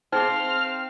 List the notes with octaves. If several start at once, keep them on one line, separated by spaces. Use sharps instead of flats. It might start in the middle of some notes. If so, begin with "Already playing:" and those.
C4 D#4 G#4 C5 F5 D6 F6